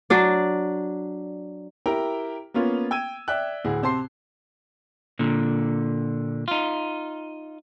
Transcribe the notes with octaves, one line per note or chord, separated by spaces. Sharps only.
F#3 D4 D5
E4 G4 A#4 G5 A#5
A#3 B3 C#4 F4
G5 E6 G#6 D#7
D5 E5 G5 F#6
D2 A2 G#4
C3 C4 C5 A5 C6 C7
A#2 D3
D#4 F4